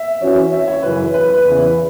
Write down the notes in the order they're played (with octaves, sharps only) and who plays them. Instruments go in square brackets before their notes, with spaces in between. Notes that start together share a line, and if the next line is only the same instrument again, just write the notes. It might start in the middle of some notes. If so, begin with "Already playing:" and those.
Already playing: [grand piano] E5
[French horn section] E3 C#4 F#4 C#5
[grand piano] E5
C#5
[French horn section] F#2 C#3 E3 [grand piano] B4
[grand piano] B4
B4
[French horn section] E2 C#3 E3